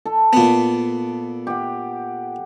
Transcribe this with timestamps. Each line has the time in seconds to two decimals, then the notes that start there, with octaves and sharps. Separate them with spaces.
0.05 A4
0.33 A#2 B3
1.47 G4 F#5